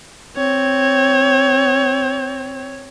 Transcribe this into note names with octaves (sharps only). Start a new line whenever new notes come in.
C4 C#5